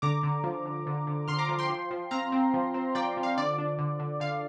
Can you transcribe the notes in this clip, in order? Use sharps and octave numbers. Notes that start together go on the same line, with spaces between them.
D3 A#5 D6
D3
F3
D3
D3
D3
D3 C6 F6
A#5 D6
F3
G5 C6
F3
F3
C4 F5 A#5
C4
F3
C4
F3 D5 G5
F3
F5
D3 D5
D4
D3
D3
D3 F5